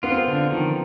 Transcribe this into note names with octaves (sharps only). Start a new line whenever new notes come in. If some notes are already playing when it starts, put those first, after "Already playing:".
B3 F4
C4
B3
D3
D#3 F3